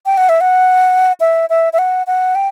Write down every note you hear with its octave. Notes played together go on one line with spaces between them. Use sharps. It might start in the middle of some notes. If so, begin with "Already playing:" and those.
G5
F#5
E5
F#5
E5
E5
E5
F#5
F#5
G5